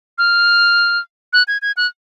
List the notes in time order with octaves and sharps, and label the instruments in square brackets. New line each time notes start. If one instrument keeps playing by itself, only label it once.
[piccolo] F6
F#6
G#6
G#6
F#6